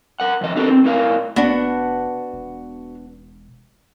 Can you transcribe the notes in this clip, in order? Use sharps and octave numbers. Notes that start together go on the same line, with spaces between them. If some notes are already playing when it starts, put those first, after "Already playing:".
A#4 F#5
F2 D#3 D#5
C4 D4 G4 A4 A#4
C4
A2 E4 A#4 F5
F1 B3 D4 F#4
E1